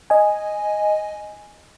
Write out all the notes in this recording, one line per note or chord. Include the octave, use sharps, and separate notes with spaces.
D#5 G#5